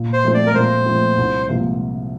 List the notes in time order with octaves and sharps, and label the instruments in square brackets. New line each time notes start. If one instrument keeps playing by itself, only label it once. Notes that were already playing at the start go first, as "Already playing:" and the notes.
Already playing: [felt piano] A#2
[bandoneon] C5
[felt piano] F3 A3 C4
[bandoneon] D5
A#4
[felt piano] A#2 [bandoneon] C5
[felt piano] F3 A3 C4
C2
C3 F3 A#3